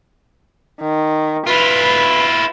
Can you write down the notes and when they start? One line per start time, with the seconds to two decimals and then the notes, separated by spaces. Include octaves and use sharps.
0.80 D#3
1.47 E4 F4 B4